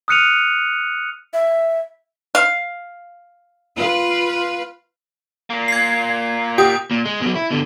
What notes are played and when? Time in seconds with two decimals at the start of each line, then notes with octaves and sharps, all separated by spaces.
0.08 D#6 F6 F#6 C#7 D#7 F7
1.33 E5
2.35 F5
3.76 F4 B4
5.50 A#2 A#3
5.68 G#6 C7
6.58 G4 D#6
6.91 A#2
7.05 G#3
7.21 B2 F#3
7.35 E4
7.51 B2 D3